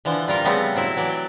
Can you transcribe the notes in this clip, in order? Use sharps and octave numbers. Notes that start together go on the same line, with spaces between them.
D3 E3 F3
G3 F4 A#4
C#3 F3 G3 A3 B3 C4
F#3 C4 E4
E3 F#3 D5